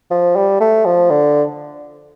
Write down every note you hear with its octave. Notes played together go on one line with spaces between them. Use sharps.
F3
G3
A3
F3
D3